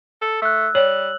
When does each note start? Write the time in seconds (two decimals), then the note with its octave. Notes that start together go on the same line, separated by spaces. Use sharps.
0.22 A4
0.42 A3 E6 F#6
0.75 G3 C#5 F#7